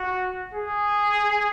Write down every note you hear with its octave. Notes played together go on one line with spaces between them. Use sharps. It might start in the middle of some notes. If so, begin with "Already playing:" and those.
Already playing: F#4
G#4